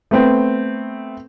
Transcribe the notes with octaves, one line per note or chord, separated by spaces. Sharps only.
A3 B3 C4